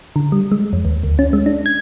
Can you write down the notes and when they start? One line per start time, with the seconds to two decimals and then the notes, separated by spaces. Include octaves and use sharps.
0.16 D3
0.32 G3
0.52 G#3
0.73 F2
0.85 D#2
1.03 D2
1.19 C#4
1.33 G#3
1.46 D4
1.66 G#6